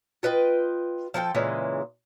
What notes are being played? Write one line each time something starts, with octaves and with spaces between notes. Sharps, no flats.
F4 B4 D#5 G5
F3 A4 A#4 G5
A#2 C#3 E3 G#3